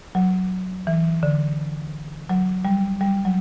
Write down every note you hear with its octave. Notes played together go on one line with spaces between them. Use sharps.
F#3
E3
D3
F#3
G3
G3
F#3